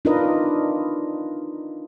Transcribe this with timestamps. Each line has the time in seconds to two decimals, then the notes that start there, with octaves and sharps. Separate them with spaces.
0.05 D4 D#4 F4 A#4 B4 D#5